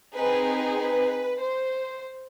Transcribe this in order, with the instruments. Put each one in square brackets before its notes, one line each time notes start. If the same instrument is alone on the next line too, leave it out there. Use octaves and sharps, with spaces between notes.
[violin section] C4 D#4 G#4 B4
B4
B4
C5